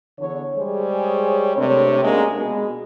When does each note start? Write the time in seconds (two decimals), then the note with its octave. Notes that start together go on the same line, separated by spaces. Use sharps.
0.19 E2 D3 C#5
0.57 G3 G#3 G#4 C5 C#5
1.56 C3 A3 C4 D4 A#4 C#5
2.03 G#3 A#3 C#4 D4 F#4
2.35 B2 G#3 G#4